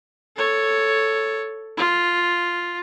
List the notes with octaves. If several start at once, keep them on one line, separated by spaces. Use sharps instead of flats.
A4 C#5
F4